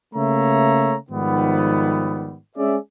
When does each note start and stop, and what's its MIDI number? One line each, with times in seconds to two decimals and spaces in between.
0.14 0.95 49
0.14 0.95 57
0.14 0.95 58
0.14 0.95 73
0.14 0.95 76
0.14 0.95 82
1.09 2.37 44
1.09 2.37 51
1.09 2.37 53
1.09 2.37 55
1.09 2.37 59
2.57 2.76 56
2.57 2.76 61
2.57 2.76 68
2.57 2.76 74
2.57 2.76 76